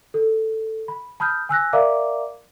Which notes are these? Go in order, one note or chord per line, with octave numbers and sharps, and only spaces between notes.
A4
B5
A5 B5 D#6 F6 G6
G#5 E6 F#6 A#6
A#4 D5 E5 F5 A#5 D6